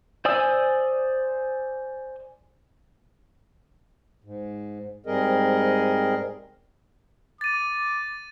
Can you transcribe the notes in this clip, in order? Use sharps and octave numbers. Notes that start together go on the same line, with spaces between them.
C5 D5 G#5 D#6 E6
G#2
G#2 G3 C4 G#4 A#4 D#5
D6 A6 D#7